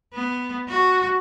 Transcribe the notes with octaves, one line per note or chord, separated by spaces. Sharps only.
B3
F#4